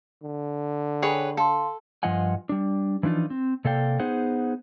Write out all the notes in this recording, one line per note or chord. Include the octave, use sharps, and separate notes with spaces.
D3
G#4 B4 C#5 G5 B5
A4 F5 A5 C6
G2 F3 F4 D#5 F#5 G#5
G3 D4
E3 F3 D4 D#4 F4
C4
C3 A#3 A4 D5 F5 G5
B3 D#4 G#4 C5 F#5